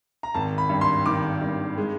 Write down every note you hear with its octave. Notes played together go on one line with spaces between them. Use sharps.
A#5
G#1 A5
B5
G2
C6
D#3 D6
G2
G#3